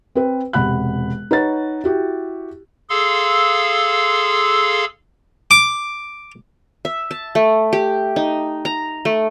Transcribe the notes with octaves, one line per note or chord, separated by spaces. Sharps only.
C4 B4
E1 C3 F#5 B5 F#6
D#4 B4 C#5 F#5 A6
E4 F#4 G4
G#4 A4 F5 C6 E6
D6
E5
A5
A3
G4
D#4
A#5
A3